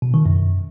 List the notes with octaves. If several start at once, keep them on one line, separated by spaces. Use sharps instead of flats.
B2
D#3
F#2